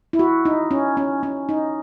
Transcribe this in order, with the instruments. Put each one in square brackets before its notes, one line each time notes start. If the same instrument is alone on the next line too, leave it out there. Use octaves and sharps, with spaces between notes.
[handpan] E4
F#4
D#4
C#4
C#4
C#4
D#4